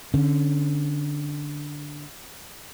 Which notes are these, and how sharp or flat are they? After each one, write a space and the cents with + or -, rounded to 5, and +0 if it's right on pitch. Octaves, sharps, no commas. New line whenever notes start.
D3 +0 C#4 -15